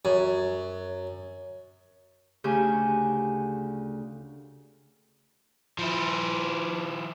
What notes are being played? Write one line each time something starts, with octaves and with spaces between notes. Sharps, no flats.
F#2
D2 C#3 G4 G#5 G6
F3 E4